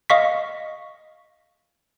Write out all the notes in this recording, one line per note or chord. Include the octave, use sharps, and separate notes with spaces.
D#5 F5 C#6 B6